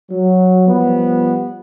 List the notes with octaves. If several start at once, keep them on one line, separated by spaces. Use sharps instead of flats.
F#3
F3 G3 B3